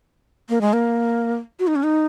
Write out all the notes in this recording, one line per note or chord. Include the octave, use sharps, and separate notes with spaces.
A#3
G#3
A#3
F#4
D#4
C#4
D#4